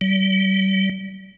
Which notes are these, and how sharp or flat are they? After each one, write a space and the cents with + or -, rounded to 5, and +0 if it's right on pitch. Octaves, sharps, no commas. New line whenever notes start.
G3 -35